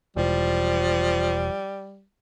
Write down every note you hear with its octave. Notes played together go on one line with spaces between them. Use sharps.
E1 F3 G3